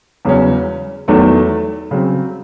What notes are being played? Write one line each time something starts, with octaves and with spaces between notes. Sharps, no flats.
E2 C#3 F#3 C#4
E2 D#3 F#3 A3
C#3 F#3 C4